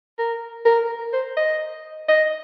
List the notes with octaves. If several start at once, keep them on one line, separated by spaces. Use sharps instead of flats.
A#4
A#4
C5
D#5
D#5